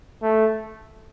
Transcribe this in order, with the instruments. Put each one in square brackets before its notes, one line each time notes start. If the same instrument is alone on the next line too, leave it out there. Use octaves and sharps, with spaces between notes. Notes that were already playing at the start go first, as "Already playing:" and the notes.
[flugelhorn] A3